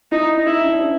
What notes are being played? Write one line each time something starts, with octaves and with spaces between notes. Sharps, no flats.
D#4 E4
D#4 E4
D4
C#4